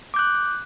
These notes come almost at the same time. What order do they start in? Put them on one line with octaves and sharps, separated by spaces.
D6 G6 F#6